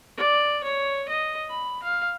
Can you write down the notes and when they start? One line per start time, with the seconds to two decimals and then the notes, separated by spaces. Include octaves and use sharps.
0.17 D5
0.64 C#5
1.09 D#5
1.49 B5
1.83 F5